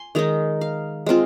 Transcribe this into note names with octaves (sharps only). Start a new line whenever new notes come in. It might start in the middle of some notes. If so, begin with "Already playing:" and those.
Already playing: G#5 C6
D#3 G#3 D#4 A#5
F5
G#3 C4 F4